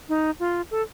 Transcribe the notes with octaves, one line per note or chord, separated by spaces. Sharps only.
D#4
F4
A4